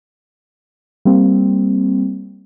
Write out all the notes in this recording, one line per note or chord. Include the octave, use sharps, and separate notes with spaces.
G3 A#3 C4